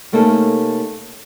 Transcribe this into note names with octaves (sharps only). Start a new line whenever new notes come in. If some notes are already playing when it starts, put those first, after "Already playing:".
C3 A3 A#3 C#4 D#4 A4